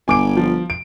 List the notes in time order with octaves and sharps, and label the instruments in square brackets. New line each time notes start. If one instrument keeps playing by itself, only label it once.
[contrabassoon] G1 [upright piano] G#5 D6 D7
[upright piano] F3
D7